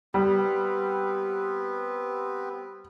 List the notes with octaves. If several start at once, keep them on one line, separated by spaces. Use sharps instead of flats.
G3 B3 C4 B4